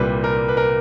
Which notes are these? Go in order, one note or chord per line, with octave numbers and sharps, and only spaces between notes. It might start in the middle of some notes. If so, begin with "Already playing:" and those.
Already playing: C2 A#2 G3 B4
A#4
B4
A#4